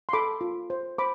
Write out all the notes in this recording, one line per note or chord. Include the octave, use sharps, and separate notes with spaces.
C6
A4 B5 D6
F4
C5
C5 B5 D6